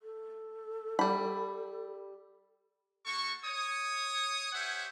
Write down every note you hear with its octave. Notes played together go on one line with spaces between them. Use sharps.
A4
G3 B5
A#3 F#4 A4 C#6
C#5 D#6
G4 C5 C#5 E5 F#5 G#5